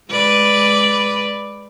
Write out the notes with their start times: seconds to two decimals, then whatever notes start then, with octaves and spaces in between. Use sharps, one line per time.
0.12 G#3 B4 D5